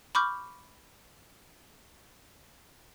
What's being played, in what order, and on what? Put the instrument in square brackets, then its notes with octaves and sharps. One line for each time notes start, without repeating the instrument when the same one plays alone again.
[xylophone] B5 C#6 D6 F6 G6